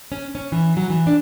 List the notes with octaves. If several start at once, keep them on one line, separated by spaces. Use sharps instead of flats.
C#4
C#4
E3
F#3
E3
D4